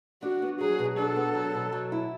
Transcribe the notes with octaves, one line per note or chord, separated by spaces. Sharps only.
D4 F#4
B3
F#3 G#4
B2
D4 A4
B3
F#3
B2
F#3
E4